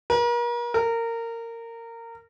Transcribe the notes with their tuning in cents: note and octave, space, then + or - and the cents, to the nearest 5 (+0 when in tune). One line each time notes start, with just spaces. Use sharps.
A#4 +40
A#4 -20